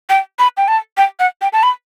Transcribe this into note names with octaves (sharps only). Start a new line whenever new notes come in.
G5
B5
G5
A5
G5
F#5
G5
A5
B5